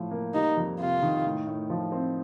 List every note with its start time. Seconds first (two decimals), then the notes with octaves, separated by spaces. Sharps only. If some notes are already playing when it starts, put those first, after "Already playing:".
Already playing: A2 F3
0.11 A#3
0.34 G3 D#4
0.57 F2
0.79 C3 F4
1.02 D#3
1.24 A2
1.47 A2
1.70 F3
1.92 C4